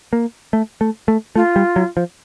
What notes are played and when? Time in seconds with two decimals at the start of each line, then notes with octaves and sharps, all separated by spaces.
0.13 A#3
0.53 A3
0.81 A3
1.08 A3
1.36 A3 F4
1.56 G3
1.76 F#3
1.97 F3